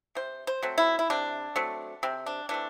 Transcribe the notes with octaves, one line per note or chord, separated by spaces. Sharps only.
C3 C5
C5
F#3 A3 C4
E4
E4
C3 D4
F#3 A3 C4
C3 C4
D4
E3 A3 C4 D4